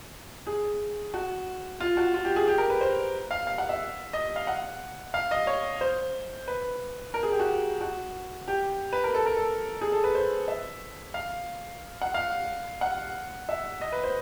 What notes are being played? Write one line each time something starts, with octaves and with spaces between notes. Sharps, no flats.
G#4
F#4
F4
F#4
F4
G4
G#4
G4
A#4
B4
C5
F5
F5
F#5
E5
D#5
F5
F#5
F5
D#5
C#5
C5
B4
A#4
G#4
G4
F#4
F#4
G4
B4
A#4
A4
A#4
A4
G#4
A4
B4
C5
E5
F5
F#5
F5
F#5
E5
D#5
B4
C5